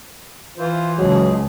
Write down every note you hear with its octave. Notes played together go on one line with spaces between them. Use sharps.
E3 F4 C5
C#2 F3 F#3 G#3 G#4